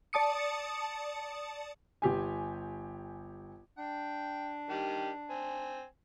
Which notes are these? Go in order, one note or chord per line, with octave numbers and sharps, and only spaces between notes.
D5 A5 D#6 C#7
G1 G4 G#5
D4 G5
D#3 G3 G4
C4 G#5